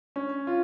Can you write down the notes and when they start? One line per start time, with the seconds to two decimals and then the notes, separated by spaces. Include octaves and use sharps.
0.16 C#4
0.47 F4